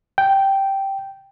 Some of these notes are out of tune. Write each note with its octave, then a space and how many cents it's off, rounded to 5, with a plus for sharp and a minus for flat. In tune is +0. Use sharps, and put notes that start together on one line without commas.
G5 -5